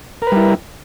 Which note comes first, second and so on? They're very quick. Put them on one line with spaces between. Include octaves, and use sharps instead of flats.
A#4 B4 G3 E4